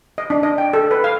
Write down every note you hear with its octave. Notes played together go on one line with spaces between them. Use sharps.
D#5
D4
D#5
G5
A4
B4
F5